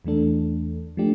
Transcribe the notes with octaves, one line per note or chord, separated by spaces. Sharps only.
E2 E3 A3 D4 A4
F3 A3 D4 G4